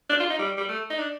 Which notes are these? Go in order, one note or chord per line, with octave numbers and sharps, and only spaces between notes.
D4
F4
D#4
G3
G3
A3
D#4
D4